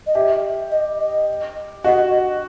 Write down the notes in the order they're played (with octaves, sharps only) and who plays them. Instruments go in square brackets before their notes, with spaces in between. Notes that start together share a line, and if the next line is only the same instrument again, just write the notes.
[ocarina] D#5
[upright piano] G4 [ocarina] E5
[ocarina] D#5
D#5
[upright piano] F#4 [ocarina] D#5